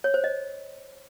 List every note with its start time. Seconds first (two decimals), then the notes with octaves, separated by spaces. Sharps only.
0.04 C#5
0.14 C5
0.24 D#5